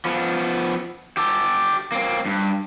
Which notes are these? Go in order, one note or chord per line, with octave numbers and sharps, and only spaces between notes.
F3 B3
G4 A4
A#3 C4
G2